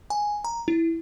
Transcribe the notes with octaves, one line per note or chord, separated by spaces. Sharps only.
G#5
A#5
E4